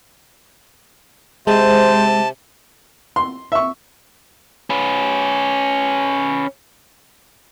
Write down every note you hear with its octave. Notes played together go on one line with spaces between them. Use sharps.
C3 G#3 C5 A5
C6
E5 C#6
C#4 B4